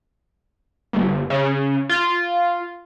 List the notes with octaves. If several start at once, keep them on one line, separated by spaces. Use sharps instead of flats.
G1
C#3
F4